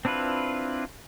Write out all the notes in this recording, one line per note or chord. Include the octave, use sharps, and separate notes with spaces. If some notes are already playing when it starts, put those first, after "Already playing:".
C4 D4 E4 F4 B4